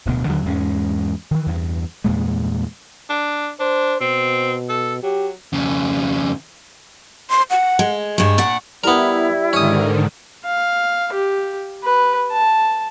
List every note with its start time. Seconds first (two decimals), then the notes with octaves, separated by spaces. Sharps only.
0.05 D1 D2 B2
0.27 D#2 D3 D#3 F#3
0.45 E2 G#2 G#3 C#4
1.31 D#3 E3
1.46 E2 G2
2.04 E2 G2 A#2 G#3
3.10 D4
3.60 D4 C5
4.01 B2 C4
4.69 A4
5.03 F#3 G4
5.53 F2 C#3
7.30 C6
7.50 F#5
7.79 G#3
8.18 G2 G#3 C#6
8.38 A#2 D5 F#5
8.84 G3 B3 E4 A#4
9.53 G#2 D3 D#3 C#4 D#6
10.45 F5
11.13 G4
11.84 B4
12.32 A5